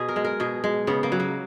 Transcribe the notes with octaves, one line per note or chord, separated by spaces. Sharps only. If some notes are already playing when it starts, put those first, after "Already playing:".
Already playing: B2 G#4
A#4
G#3
A#4
B2 G#4
G#3
C#3 B3
A#3
F#3
A#3